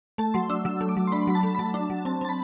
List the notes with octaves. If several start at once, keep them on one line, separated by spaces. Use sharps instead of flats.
A3 A5
F#3 C6
D4 E6
F#3 E6
A3
D6
F#3
C6
D4 B5
F#3 B5
A5
A3
B5
F#3 A5
D4
F#3
C4 A5
C4 A5
B5